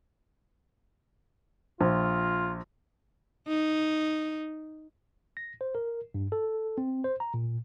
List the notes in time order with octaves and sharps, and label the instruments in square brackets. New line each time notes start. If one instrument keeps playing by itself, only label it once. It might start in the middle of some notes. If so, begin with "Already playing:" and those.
[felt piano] A#1 [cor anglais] F4
[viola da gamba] D#4
[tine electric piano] A#6
C5
A#4
G2
A4
C4
C5
A#5
A#2